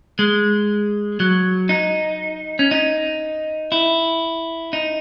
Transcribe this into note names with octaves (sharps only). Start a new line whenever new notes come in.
G#3
F#3
D#4
C#4
D#4
E4
D#4